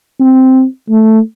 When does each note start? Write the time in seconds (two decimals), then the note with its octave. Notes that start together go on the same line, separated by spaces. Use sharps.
0.20 C4
0.90 A3